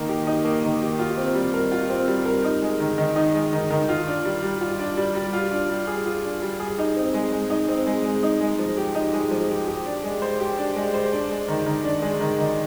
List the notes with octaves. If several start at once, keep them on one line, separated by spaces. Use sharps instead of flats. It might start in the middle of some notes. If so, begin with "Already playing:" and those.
Already playing: D#3 A#3 D#4
G4
D#4
A#3
D#3
G4
F4
C4
G3
A#4
F4
C4
G3
A#4
D#4
G#3
D#3
D#3
D#4
G#3
D#3
D#3
F4
D4
G3
G3
F4
D4
G3
G3
F4
D4
G3
G#4
F4
D4
G3
G#4
D#4
C4
G#3
G#3
D#4
C4
G#3
G#3
D#4
G#3
F3
G4
D#4
G#3
F3
G4
G4
D4
G#3
C5
G4
D4
G#3
C5
D4
G#3
D#3
D#3
D4
G#3
D#3
D#3